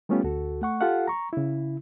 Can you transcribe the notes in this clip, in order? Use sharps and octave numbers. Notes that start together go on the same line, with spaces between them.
G3 A3 B3 C#4 F4 G4
D2 F#4 A4
A3 F#5 C#6
F4 G4 A4 F5 F#5
A#5 C#6
C#3 E4